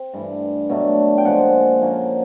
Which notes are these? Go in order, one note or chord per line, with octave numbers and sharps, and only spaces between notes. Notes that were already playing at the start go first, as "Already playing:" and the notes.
Already playing: C4
G2 E3 A3
B2 F#3 A3 D4
G5
A#2 F3 G#3 F#5
D3 F3 A#3 C#4